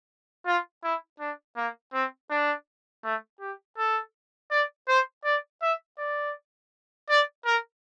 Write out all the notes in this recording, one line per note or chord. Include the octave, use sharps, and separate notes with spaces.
F4
E4
D4
A#3
C4
D4
A3
G4
A4
D5
C5
D5
E5
D5
D5
A#4